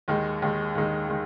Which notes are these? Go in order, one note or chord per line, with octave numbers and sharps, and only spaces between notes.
D#2 D#3 G#3
D#2 D#3 G#3
D#2 D#3 G#3
D#3 G#3